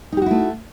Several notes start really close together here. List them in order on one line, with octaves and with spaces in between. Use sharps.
D#4 G4 F#4 E4 A3